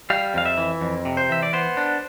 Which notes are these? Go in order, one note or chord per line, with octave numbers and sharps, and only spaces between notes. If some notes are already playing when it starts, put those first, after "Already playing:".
G3 F5
F2 F5
E5
E3
F2
C3
C5
E3 E5
D5
B3 C5
D4